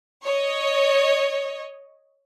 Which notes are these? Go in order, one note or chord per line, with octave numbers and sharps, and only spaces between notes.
C#5 D#5